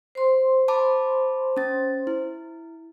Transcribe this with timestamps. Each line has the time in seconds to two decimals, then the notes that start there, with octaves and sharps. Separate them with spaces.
0.15 C5 C6
0.68 A5 B5 D6
1.57 C#4 A6
2.07 E4